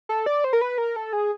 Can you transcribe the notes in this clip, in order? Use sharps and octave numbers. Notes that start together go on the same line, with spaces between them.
A4
D5
C5
A#4
B4
A#4
A4
G#4